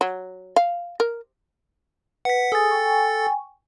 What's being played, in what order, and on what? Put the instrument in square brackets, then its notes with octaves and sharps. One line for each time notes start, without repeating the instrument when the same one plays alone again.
[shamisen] F#3
F5
A#4
[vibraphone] B4 [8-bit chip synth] F#5 B6
[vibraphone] G#4 G#5 D#6 [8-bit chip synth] A4 A6
[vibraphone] G5 G#5 C#6